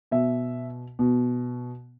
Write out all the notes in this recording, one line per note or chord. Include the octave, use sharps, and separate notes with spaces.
B2 E5
B2